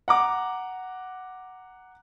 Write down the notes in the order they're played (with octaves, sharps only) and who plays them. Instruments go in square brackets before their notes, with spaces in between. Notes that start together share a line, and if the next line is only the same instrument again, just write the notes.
[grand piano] F#5 A#5 D6